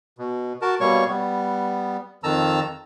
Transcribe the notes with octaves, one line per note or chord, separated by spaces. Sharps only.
B2
F#4 A#4 A5
B2 G3 A#3 C#5 C#6
G3 B3
F2 D#3 A5 A#5 E6